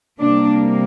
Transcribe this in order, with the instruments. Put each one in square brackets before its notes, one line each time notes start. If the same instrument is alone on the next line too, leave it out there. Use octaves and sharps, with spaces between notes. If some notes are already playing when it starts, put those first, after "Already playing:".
[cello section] C3 G3 A#3 D4